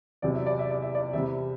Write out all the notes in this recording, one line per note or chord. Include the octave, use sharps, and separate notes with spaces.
E2 C3 F#3 D5
E5
D5
E5
D5
E5
D5
E2 C3 G3 E5